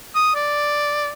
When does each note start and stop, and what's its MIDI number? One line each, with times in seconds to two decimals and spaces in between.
0.15 0.34 87
0.35 1.11 74